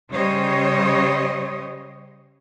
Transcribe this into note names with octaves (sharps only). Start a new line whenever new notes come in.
C#3 G3 C5 C#5 D#5